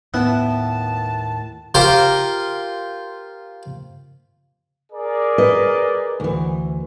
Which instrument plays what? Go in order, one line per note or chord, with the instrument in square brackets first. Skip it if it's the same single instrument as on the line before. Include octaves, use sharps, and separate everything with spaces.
[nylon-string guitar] D#2 A2 E4 [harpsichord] B3 [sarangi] A5
[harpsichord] F4 G4 A#4 C5
[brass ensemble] G#4 A#4 D5
[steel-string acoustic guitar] B4 D#5
D2 E3